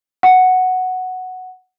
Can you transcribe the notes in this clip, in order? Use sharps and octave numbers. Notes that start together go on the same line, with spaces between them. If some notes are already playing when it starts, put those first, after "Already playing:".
F#5